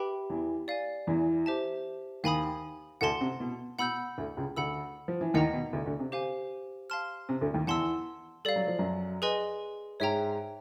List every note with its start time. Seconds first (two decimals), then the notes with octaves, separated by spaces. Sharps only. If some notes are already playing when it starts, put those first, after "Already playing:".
Already playing: G4 B4 E5 G5 B5
0.30 E2 E3
0.68 D5 F5 G#5
1.07 E2 E3
1.46 G4 C5 E5 A5
2.23 D#2 D#3 F5 G#5 B5 D#6
3.01 D2 D3 F#5 A5 C6
3.21 C3
3.40 B2
3.79 B2 F#5 B5 E6 G6
4.18 D2 D3
4.37 C#2 C#3
4.56 D2 D3 F#5 B5 E6
5.08 F3
5.21 E3
5.34 D#2 D#3 D#5 F#5 A#5
5.53 B2
5.73 D2 D3
5.86 D2 D3
5.99 C3
6.12 G4 C5 F5 G#5
6.90 F5 A5 C6 F6
7.29 C3
7.41 D2 D3
7.54 D#2 D#3
7.67 E2 E3 F#5 A5 C6 E6
8.45 G3 A4 D5 F5
8.56 F#3
8.67 F3
8.79 F#2 F#3
9.22 G#4 B4 D#5 G#5 C6
10.00 G#2 G#3 C#5 E5 G5 A#5